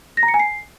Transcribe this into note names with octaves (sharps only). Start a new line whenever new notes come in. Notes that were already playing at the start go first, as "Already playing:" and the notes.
A#6
A#5
C#7
G#5
C7